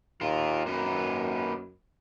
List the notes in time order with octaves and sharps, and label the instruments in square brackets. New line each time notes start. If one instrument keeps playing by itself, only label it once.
[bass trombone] D#2 [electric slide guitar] F4 A#4
[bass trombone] F#2 [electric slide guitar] A#3 D#4 B4